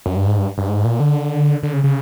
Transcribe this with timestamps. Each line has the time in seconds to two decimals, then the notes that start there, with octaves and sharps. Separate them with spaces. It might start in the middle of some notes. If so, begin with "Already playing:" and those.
0.06 F#2
0.16 G2
0.27 G#2
0.38 G2
0.58 G2
0.68 G#2
0.84 A#2
1.00 D3
1.63 D3
1.73 C#3
1.84 C#3